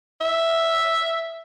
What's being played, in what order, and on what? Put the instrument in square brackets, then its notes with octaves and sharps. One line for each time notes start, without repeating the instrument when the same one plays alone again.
[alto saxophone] E5